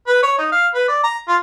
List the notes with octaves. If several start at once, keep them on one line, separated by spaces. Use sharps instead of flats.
B4
C#5
D#4
F5
B4
D5
A#5
F4